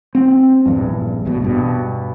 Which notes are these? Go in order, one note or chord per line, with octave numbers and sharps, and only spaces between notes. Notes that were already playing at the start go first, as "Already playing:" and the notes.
C4
A#1 E2 G2
A1 E2 B2
G2 B2